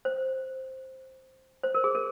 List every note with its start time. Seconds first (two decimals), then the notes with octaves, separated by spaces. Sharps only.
0.05 C5
1.63 C5
1.74 A#4
1.84 G#4
1.95 A#4